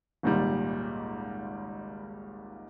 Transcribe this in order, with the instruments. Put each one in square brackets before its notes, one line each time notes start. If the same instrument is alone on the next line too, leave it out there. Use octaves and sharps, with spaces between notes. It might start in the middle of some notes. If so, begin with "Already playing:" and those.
[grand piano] G#1 C#2 A#2 D#3 G3